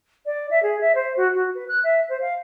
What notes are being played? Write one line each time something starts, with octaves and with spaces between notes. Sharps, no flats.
D5
E5
G#4
E5
C5
F#4
F#4
B4
F#6
E5
C5
F5